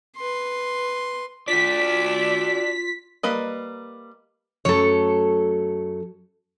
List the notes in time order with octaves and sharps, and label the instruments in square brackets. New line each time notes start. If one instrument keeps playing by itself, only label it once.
[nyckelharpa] B4 C6
[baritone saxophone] D4 [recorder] F4 [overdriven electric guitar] F#4 D5 [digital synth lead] B6
[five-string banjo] G3 A#3 B4 D#5
[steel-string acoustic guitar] F#2 F#3 A3 [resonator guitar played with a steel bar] A4 C#5